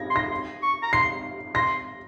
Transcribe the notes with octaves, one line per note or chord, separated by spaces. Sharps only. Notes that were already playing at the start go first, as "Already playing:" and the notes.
Already playing: G#6 A#6
C6
A#6
C6
C#6
A#5
C6 C7
C6 A#6